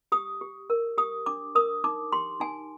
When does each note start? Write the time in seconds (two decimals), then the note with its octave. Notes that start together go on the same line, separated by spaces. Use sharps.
0.12 G4 D#6
0.41 G4
0.70 A#4
0.98 G4 D#6
1.26 D4 D6
1.55 A#4 D#6
1.84 D#4 D6
2.12 G4 C6
2.40 D#4 G#5